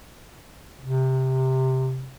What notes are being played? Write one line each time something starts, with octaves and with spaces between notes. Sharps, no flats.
C3